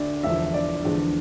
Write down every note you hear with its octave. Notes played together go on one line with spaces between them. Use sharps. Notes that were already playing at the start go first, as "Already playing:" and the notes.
Already playing: D2 D3 D5
E1 E2 D3 F3 E5
D5
E2 D3 F3 G#3